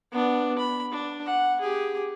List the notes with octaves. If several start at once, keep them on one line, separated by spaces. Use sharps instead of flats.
B3 D4
B5
D4
F#5
G4 G#4